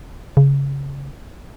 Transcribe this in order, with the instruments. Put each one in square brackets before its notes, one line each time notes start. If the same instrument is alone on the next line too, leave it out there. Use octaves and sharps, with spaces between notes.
[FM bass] C#3